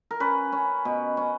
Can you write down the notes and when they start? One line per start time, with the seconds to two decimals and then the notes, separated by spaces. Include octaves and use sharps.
0.11 A#4
0.20 C#4 B4
0.52 C#4
0.85 B2
1.17 C#4